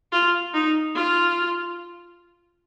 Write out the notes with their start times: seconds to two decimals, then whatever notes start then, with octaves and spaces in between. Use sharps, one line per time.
0.13 F4
0.54 D#4
0.95 F4